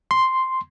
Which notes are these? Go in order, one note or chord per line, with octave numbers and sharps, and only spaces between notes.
C6